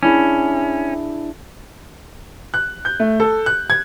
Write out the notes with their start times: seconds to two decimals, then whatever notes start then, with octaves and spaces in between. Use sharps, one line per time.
0.03 C#4 D4 E4 G#4
2.54 F#6
2.85 G6
3.00 A3
3.20 A4
3.46 F#6
3.70 G#6